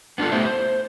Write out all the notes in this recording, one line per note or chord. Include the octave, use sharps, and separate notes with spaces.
B3 D4 D#4 F4 A4
A3 B3 E4 G4 C5 E5
C5